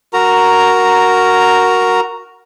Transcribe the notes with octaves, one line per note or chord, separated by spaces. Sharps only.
F#4 A#4 A#5